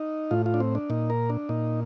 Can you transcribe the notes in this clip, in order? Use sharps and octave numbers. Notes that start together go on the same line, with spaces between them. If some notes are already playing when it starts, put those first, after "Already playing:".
Already playing: D#4
A2 F4
F4
D4
C4
D4
A#2 D#4
A#4
D4
A#2 D#4